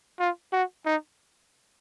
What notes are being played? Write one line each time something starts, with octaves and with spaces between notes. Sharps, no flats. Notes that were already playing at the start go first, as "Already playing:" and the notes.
F4
F#4
D#4